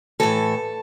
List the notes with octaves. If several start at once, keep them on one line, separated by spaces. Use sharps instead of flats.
A2 E3 A4